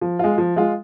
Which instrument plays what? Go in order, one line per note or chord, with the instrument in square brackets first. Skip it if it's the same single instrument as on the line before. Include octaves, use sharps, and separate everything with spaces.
[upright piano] F3
G#3 F4
F3
G#3 F4